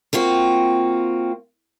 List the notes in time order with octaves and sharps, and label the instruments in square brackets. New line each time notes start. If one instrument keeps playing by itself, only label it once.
[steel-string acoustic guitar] A#3 C4 F4 F#4